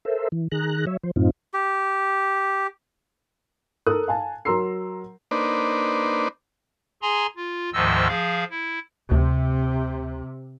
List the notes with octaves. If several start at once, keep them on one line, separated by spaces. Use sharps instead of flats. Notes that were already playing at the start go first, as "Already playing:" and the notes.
A4 A#4 C5 E5
E3
D#3 G#4 A#5 F#6
F#3 C#5 E5
F3 C5
F#2 A2 C4 D#4 F4
G4
A4 A#4 D#6 F#6
F5 G#5 A5
F#3 A#4 A#5 C6 E6 C7
A#3 D4 D#4 B4 C5 D5
G#4 G#5 A#5 C6
F4
D2 G#2 D#3 F3 D#5 E6
F3 G#4 F5
E4
D2 C3